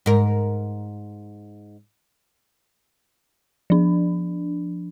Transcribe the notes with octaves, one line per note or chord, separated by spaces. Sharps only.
G#2 A#4
F3 D4